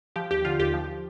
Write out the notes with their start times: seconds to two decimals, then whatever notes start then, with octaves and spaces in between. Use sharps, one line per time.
0.16 F3 G4
0.31 D#2 G4
0.45 D3 F4
0.60 D#2 G4
0.74 F3